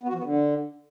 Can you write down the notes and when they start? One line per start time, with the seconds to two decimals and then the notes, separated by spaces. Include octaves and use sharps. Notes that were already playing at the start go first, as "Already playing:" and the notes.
0.03 B3
0.08 F#4
0.14 F3
0.19 B3
0.24 D3